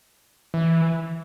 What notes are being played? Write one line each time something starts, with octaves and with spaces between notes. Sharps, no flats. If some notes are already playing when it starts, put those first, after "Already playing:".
E3